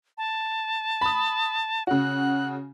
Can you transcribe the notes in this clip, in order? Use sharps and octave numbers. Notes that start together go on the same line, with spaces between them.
A5
B5 D#6
C#3 F#4 F#6